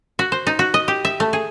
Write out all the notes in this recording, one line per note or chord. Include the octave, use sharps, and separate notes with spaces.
F#4
C5
D#4
F#4
D#5
G4
E5
A3
G#4